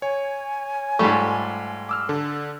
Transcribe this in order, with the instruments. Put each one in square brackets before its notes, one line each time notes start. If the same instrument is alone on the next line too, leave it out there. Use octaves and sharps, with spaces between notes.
[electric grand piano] C#5 [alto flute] G#5
[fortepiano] G#2 F4 C#6 [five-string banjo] G3 A3
[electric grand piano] D6 E6 F6
D3 A4